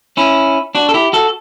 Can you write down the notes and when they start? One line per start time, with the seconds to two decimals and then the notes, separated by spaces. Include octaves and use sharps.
0.17 C#4 E4
0.75 D4 F#4
0.89 A4
0.94 E4 G4
1.13 F#4 A4